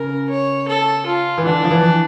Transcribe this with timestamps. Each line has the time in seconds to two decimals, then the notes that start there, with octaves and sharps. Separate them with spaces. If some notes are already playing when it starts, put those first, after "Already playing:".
Already playing: C#3 A#4
0.29 C#5
0.68 A4
1.06 F4
1.38 E3
1.45 D3 D4
1.64 F3
1.71 E3